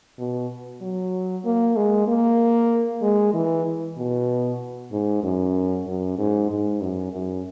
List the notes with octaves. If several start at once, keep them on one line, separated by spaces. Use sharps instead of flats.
B2
F#3
A#3
G#3
A#3
G#3
E3
B2
G#2
F#2
F#2
G#2
G#2
F#2
F#2